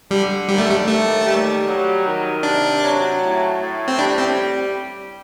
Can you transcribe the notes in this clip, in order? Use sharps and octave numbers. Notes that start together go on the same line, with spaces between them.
D3 G3
D#2 G3
A3
G3
D#2 A3
G3
F#3
D#3
C3 D4
F#3
A2
A2
C4
G3 D4
C4